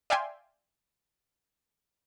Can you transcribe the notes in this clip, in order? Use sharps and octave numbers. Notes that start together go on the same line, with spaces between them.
D5 E5 F5 G5 G#5 C6